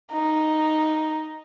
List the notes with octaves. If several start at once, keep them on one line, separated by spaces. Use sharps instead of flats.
D#4